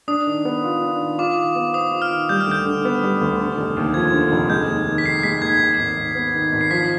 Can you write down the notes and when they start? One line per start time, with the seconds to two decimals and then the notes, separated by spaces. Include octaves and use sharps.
0.08 D4 D#6
0.27 D#3
0.45 B3
0.64 F4
0.82 D4
1.00 D#3
1.19 F4 D6
1.37 D#3
1.55 B3
1.74 C5 D#6
1.92 F4
2.02 F6
2.11 D#3
2.29 G3 G6
2.41 F6
2.47 D2 G6
2.65 D3
2.85 B3
3.03 G3
3.21 D2
3.40 D3
3.57 F1
3.76 D#2
3.94 F3 G#6
4.13 D3
4.32 F1
4.50 G#3 G6
4.68 D#2
4.87 D#3
4.98 B6
5.06 D#2 C7
5.23 G#3 B6
5.41 D#2 G#6
5.60 D#3
5.79 G#1
5.97 G#2
6.15 B3
6.34 D#3
6.52 G#1
6.61 C7
6.71 F3 B6